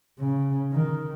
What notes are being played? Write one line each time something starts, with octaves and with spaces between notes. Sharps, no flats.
C#3
D#3